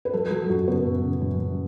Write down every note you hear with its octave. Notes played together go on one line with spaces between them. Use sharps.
B4
F#3 A4
F#3 A4
F#2 F#4
C#3 B3
F#2
C#3
F#2
F#2